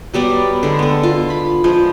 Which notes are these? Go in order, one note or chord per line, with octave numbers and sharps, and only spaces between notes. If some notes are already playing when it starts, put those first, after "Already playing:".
F#3 G3 B3 D5
D3 G#3
B3 A4
F4
B5
F3 G#3